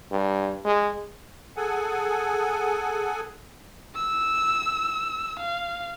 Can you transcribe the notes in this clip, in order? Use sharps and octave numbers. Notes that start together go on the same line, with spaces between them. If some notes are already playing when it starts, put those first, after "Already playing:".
G2
G#3
G#4 A4 F#5 G#5
E6
F5